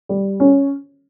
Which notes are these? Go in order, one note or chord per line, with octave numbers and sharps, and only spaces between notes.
G3
C#4